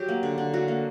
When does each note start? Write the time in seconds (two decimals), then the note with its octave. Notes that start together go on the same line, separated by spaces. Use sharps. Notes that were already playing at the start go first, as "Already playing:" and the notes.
Already playing: F#3 G4
0.08 A#3
0.23 D3
0.38 D3
0.53 F#3 F#4
0.68 A#3